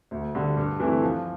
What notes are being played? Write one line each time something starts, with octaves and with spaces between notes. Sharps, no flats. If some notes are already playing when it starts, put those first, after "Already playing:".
D2
D3 G3
G2
E3 A3 C4 E4
F3